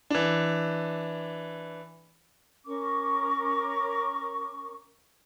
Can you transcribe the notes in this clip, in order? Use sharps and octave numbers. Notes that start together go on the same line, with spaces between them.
E3 D4
C#4 A#4 C#6 D6